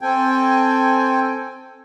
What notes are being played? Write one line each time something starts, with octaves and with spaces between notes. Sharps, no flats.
C4 A4 G5 G#5